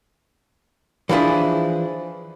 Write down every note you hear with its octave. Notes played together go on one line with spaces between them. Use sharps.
E3 F3 D4 E4 G#4